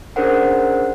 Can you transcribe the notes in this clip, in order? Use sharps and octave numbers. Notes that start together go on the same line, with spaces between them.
C#4 D4 G#4 A#4 C5 F#5